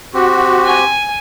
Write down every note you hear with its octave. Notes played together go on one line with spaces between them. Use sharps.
C4 F#4 G4
G#5